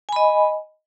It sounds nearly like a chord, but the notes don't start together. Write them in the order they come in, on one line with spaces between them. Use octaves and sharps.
G#5 B5 D#5